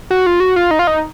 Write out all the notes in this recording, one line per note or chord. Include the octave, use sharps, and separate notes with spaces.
F#4
F4
F#4
F4
D#4
F4
D#4